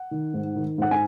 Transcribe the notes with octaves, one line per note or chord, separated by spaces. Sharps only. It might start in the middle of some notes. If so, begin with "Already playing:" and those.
Already playing: F#5
D#3
G#2
D#3
G#2 F#5
G#5